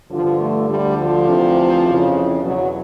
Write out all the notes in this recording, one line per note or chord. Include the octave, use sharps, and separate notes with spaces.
G2 D3 F3
A3
D2 D3 G3
F3
D2 C3 E3
F2 C#3 E3
E2 B2 F#3